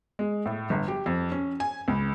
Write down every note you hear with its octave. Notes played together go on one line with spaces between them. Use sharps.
G#3
A2
G1
G4
F2
C#4
G#5
C#2